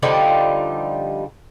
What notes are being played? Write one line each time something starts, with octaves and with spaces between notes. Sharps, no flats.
D3 F3 G3 D#4